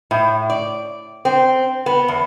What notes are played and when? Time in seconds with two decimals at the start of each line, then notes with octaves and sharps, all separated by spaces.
0.11 A2
0.50 D5
1.25 C4
1.86 B3
2.08 E2